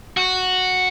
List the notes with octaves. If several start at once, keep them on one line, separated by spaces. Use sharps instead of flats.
F#4